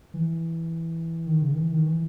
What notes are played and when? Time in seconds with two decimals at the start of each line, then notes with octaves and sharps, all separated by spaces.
0.14 E3
1.27 D#3
1.42 C#3
1.52 D#3
1.56 E3
1.72 D#3
1.86 E3